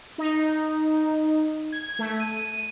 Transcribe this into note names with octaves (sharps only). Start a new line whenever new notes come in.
D#4
G#6
A3
D#7